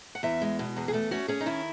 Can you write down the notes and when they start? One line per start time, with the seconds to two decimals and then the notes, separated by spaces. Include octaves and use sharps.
0.15 F#5
0.23 E2 E5
0.41 G#3
0.59 B2
0.76 E2 G#4
0.88 G#4
0.93 A3 A4
1.11 C#4 F#4
1.28 C#4 G#4
1.41 D#4
1.46 D#3 E4